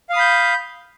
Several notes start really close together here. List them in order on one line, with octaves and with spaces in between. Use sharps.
F5 D#6 B5 G6